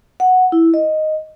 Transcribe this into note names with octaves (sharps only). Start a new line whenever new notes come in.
F#5
E4
D#5